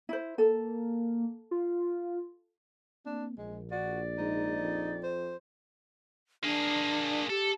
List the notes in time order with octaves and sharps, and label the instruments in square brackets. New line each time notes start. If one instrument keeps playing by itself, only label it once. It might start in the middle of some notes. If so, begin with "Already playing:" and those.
[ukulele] E4 C5
[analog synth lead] A#3 [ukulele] A4
[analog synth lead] F4
[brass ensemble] A#3 C4 [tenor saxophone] D4
[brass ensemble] A#1 [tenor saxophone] G#3
[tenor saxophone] F#4 [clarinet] D5
[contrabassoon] G#2 [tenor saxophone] D#4
[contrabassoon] F2
[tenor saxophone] C5
[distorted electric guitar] A#3 G#4 [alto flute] D4
[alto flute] G4 [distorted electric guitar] A4